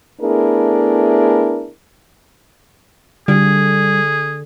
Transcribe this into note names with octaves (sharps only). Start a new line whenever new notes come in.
A3 B3 D4 E4 G#4 A#4
D3 G3 G#4